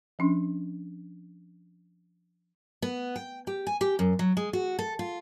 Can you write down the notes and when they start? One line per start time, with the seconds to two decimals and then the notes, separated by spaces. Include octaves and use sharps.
0.19 F3 C#4 D4
2.82 B3
3.16 G5
3.47 G4
3.67 G#5
3.81 G4
3.99 F#2
4.19 F#3
4.37 G#3
4.53 F#4
4.79 A4
4.99 F4